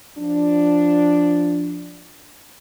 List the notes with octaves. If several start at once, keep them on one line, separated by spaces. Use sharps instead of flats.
F3 D4